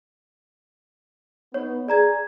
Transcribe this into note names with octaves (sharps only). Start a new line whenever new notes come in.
B3 D#4 C#5
G#4 D5 A#5 G#6